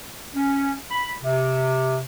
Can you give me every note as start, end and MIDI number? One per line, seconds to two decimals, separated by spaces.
0.34 0.73 61
0.91 1.11 83
1.23 2.01 48